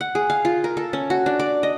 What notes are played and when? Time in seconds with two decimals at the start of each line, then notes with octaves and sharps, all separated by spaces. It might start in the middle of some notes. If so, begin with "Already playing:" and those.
0.01 F#5
0.15 G#4
0.30 F5
0.45 F4
0.64 A#4
0.77 A4
0.93 C#4
1.10 F#4
1.26 D4
1.40 D5
1.63 D#5